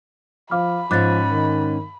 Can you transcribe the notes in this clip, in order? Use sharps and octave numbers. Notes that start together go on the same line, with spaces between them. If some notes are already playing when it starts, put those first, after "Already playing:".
F3 F5 B5 D6 F6
G#2 F3 C#4 D6 F#6 A6
D#3